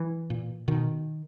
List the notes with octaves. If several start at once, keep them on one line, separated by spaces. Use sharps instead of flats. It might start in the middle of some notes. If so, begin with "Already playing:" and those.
Already playing: E3
A#2
B2 D#3